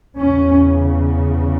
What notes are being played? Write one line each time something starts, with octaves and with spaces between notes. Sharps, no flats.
E2 C#3 C#4